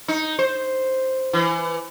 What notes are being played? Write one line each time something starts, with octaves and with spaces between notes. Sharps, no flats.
D#4
C5
E3